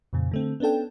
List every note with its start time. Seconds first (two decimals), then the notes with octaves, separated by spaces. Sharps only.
0.13 F2 A#2 C#3
0.31 D3 A3 C4
0.60 B3 C#4 D4 A4 G5